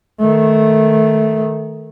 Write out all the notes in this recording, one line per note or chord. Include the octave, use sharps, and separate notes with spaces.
D#3 A3